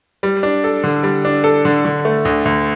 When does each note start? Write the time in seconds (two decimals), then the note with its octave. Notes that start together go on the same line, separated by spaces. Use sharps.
0.23 G3
0.43 D4
0.64 A4
0.84 D3
1.03 G3
1.25 D4
1.44 A4
1.65 D3
1.85 D3
2.05 A3
2.25 D2
2.45 D2